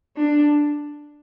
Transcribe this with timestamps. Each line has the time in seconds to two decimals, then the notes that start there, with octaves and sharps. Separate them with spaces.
0.17 D4